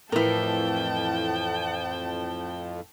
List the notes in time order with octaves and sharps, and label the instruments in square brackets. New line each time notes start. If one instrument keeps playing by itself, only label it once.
[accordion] F2 F3 [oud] A2 E3 [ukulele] E4 A#4 [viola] G5 A5